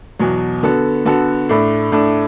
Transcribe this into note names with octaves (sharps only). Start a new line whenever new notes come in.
E2 B2 F#3
D3 B3 F#4 A4
D3 B3 F#4 A4
A2 A3 D4
A2 A3 D4